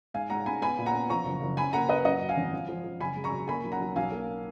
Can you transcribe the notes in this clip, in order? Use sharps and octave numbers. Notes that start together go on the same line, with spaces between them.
G#2 F5 G#5
G#2 F#5 A#5
G#2 G#5 B5
B3 G#5 B5
A#2
F#5 A#5
B3
F3 A#5 C#6
F#1
F#1
C#4 G#5 B5
A#3 F#5 A#5
C#4 B4 D#5
F#2 D#5 F#5
F#2
F5 G#5
G#1
F3
F3
F3
F#1 G#5 B5
G#3
A#5 C#6
F#2
A#3 G#5 B5
B1
F#5 A#5
B1
B1 F5 G#5
A#3